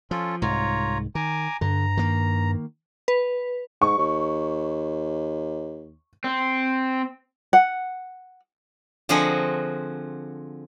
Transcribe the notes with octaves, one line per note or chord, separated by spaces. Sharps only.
F3 C#4 F4 A4
C2 G#2 F4 C#5 A#5
D#3 G#5 A#5 D6
G2 D3 A#5
D#3 A#3
B4
G#2 C#6
D#2
C4
F#5
D3 F3 C4 F#4 G#4 D#5